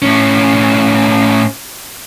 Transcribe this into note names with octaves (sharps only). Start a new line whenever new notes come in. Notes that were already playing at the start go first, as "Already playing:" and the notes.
A2 C#4